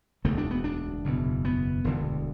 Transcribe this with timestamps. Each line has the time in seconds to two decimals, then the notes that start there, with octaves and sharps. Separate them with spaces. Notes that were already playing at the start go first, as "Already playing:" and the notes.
0.24 E1 D2 D3 A3
0.38 D4
0.51 B3
0.64 D4
1.04 F#1 E2 B2
1.45 B3
1.84 E1 D2 D3